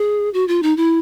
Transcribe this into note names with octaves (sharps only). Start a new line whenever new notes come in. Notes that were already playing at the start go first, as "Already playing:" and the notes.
Already playing: G#4
F#4
F4
D#4
E4